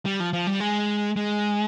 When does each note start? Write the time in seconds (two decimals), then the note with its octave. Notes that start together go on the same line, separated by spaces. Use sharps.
0.05 G3
0.20 F3
0.33 F3
0.47 G3
0.60 G#3
1.16 G#3